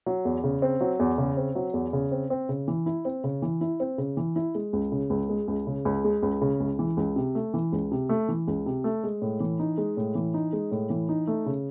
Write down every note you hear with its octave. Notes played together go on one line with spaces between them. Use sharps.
F#3
E2
C#3
C4
F#3
E2
C#3
C4
F#3
E2
C#3
C4
C4
C#3
E3
E4
C4
C#3
E3
E4
C4
C#3
E3
E4
G#3
C#2
C#3
C#2
G#3
C#2
C#3
C#2
G#3
C#2
C#3
C#2
E3
C#2
C3
A3
E3
C#2
C3
A3
E3
C#2
C3
A3
G#3
A2
E3
D#4
G#3
A2
E3
D#4
G#3
A2
E3
D#4
A3
C#3